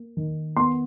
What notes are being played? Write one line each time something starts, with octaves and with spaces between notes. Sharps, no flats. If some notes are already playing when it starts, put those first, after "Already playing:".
Already playing: A#3
D#3
B3 C6